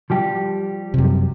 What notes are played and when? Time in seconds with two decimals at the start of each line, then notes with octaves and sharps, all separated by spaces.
0.10 F3 G3 G4
0.94 F#2 C3